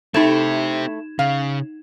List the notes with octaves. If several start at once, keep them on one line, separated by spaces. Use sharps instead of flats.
A3 C4 D#4 E4 G4 G#6 E7
C#3 F5